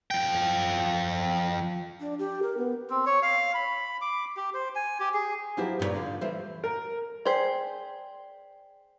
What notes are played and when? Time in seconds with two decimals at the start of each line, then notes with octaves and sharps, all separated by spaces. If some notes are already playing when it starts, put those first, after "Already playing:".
0.11 F3 G5
2.00 D4
2.19 G4
2.43 A#4
2.58 B3
2.90 C4
3.06 C#5
3.22 F5
3.54 B5
4.01 D6
4.37 G4
4.54 C5
4.75 G#5
5.00 G4
5.14 G#4
5.57 F3 F#3 E4 F#4 G4 C5
5.79 G2 A#2 D4 C#5 D5
5.94 D3 F3
6.21 E3 G3 A3 C5
6.64 A#4
7.25 G#4 C5 D5 G5 B6